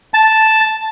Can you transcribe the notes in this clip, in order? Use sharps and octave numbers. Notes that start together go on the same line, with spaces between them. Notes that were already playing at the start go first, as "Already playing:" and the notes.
A5